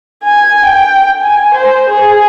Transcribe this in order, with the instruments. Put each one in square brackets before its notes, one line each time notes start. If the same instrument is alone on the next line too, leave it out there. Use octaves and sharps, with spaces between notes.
[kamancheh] G#5
G5
G#5
C5
G#4